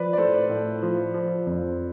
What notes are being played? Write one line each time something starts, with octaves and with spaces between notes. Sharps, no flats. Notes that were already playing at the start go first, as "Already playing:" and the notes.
Already playing: F3 B4 D5
D5
A2 A4 C5
A2
F3
F3
F2